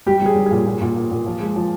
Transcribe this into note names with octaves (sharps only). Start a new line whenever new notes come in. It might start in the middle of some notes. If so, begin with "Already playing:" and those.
G3 G4
G3 G#4
G3
A#2 G#4
A#2
A#2
A#2
A#2
F3
G#3
F3